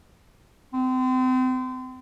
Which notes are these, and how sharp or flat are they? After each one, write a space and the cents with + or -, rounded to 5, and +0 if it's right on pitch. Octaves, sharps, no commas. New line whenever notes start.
C4 -30